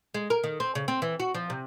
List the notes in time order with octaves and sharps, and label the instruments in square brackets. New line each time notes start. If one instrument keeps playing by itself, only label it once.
[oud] G#3
A#4
D#3
C4
C#3
C4
E3
F#4
F3
C3